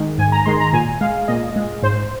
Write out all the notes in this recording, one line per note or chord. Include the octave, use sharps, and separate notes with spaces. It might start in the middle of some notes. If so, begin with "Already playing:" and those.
Already playing: D#3 G#3
G#2 G#5
A#5
D#3 G#3 C6
A#5
A#2 G#5
G#3 F5
A#2 D#5
G#3
G#2 C5